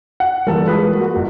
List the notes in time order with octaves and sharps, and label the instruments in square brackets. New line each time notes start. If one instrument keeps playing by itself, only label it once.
[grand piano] F#5
[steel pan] E3 G3 [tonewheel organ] A#3 [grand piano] A4 A#4
[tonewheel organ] G#3 [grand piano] F4 B4 D#6
[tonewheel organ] A#3 F#4
[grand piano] G1